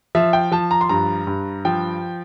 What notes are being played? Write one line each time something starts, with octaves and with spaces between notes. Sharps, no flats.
F3 E5
G5
F3 A5
A#5
C6
G2 A#5
G2
F3 G5